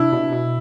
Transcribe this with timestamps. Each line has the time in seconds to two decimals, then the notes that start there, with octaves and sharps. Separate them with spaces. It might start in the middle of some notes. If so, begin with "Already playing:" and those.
Already playing: C3 D4 E4
0.12 B2
0.32 B2